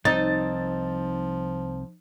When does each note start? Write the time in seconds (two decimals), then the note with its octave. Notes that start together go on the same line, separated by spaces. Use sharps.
0.05 C2 F3 C4 D#4 A6